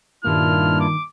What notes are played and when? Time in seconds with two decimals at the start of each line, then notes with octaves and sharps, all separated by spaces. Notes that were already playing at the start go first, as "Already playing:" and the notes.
0.24 G2 A#2 D#3 A#3 D4 E4 F4 F6
0.80 D6